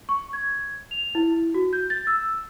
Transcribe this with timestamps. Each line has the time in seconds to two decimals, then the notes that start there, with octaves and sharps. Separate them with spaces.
0.09 C#6
0.33 G#6
0.91 F7
1.15 E4
1.54 F#4
1.73 G6
1.90 A6
2.07 E6